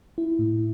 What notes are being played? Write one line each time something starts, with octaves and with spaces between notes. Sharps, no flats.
E4
A2